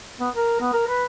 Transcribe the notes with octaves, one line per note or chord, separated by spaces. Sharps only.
B3
A#4
B3
A#4
B4